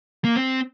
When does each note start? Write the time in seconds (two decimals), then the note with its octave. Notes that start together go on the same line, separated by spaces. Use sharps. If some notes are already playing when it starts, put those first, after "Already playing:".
0.24 A#3
0.36 C4